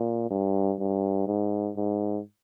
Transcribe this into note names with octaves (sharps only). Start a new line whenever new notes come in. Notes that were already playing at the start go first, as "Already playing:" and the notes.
Already playing: A#2
G2
G2
G#2
G#2